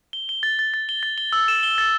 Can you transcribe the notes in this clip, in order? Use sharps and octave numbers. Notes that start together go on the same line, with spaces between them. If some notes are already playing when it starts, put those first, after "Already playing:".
G7
G7
A6
A6
A6
G7
A6
G7
E6
E7
G7
A6